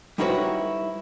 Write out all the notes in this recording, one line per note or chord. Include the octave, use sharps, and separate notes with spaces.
G3 D#4 E4 F#4 B4 C#5